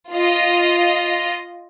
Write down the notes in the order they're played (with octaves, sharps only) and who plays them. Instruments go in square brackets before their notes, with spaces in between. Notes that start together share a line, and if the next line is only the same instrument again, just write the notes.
[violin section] F4 D#5